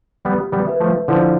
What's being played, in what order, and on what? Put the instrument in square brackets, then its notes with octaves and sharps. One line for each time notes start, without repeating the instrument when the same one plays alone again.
[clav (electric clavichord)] G3 B3 [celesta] G4
[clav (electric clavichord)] G3 B3
[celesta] B4 E5
[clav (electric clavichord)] F3 A3
[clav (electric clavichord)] D3 F3 [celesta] E4